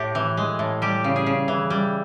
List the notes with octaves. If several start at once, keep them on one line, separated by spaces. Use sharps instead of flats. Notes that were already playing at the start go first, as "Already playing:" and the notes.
Already playing: A2 G4
E3
G#3
A2
G3 G4
C#3
G#4
C#3
E3
G3